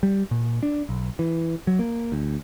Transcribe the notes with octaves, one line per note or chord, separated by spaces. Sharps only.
G3
A#2
D4
B1
E3
F#3
A#3
D2